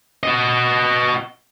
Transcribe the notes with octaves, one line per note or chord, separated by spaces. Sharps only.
F#4 D#5